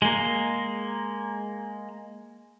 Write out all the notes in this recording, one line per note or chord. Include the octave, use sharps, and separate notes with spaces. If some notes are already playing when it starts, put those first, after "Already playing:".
G#3 A#3